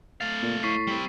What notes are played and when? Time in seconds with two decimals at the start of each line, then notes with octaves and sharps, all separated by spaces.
0.21 A3 F5 A6
0.43 A#2
0.63 A2 C#6 B6 C7
0.87 G3 C4